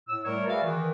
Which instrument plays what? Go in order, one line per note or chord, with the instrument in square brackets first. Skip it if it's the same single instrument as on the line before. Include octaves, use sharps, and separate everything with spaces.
[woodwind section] A2 E6
G3 A3 A#4 C#5
F#4 G#4 B4 D5 E5 F5
D#3 E3